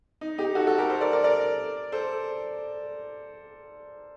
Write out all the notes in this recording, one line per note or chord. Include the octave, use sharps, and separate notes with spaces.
D#4
D#4 G4
F#4 A4
F#4 A4
G4 A#4
A4 C5
A#4 D5
A#4 D5
A#4 D5
A4 C5